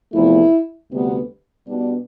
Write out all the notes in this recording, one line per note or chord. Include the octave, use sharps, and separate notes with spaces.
E2 C3 F3 A3 E4
D2 C3 G3 B3
B2 G3 B3 D4